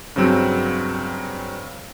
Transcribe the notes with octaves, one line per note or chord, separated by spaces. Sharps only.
G2 C#3 F#3 C4 E6